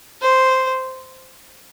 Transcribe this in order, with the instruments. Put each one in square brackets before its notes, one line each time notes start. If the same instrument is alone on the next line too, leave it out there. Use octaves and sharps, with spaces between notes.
[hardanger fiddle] C5